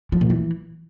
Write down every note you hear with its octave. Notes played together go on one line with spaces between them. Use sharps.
F3
A#2
E3